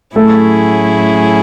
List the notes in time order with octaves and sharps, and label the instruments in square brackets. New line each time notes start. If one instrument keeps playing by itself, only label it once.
[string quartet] A2 F#3 C#4 E4 G#4 [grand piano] A3 A4